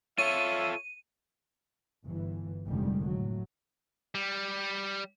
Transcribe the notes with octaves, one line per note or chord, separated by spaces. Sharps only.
F4 A4 C#5 E5 D#7
G1 E3
F1 A2 D3 D#3 G3 G#3
A2 F#3
G3